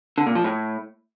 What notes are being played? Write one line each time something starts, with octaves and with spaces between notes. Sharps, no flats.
D3
A#2
F3
A2